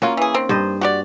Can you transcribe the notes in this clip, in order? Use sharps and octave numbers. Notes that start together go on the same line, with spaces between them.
F#3 A#3 C#4 F4
E3 G#4
D#3 C4
G2 C5 D#5
F#4 G4 D5